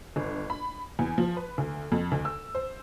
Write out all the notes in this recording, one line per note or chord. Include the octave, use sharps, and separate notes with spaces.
G1
B5
E2
F3
B4
D2
F2
D2
E6
C5